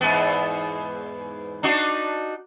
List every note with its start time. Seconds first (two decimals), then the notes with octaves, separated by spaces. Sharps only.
0.01 E2 G#2 B3
1.63 D4 D#4 F#4